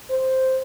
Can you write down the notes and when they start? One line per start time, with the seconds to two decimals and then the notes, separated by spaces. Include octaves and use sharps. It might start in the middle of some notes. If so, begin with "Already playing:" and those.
0.10 C5